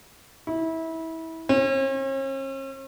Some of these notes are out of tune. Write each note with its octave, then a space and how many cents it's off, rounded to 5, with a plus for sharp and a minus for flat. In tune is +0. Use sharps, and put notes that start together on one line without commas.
E4 -25
C#4 -45